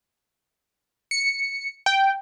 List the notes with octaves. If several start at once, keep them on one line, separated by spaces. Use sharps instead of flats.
C#7
G5